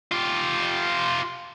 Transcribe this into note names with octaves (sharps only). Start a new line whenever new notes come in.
F4 G4